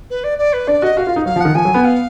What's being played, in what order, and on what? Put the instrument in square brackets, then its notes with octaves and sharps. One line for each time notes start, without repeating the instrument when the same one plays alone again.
[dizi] B4
D5
D5
B4
[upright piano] D4 [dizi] D5
[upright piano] F#4 [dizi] D#5
[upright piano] F#4 [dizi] F5
[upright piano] F4
D#4
[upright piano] F#3 [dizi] F5
[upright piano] F3
[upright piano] D#3 [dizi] F#5
[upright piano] F3 [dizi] G#5
[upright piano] F#3
B3
[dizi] F5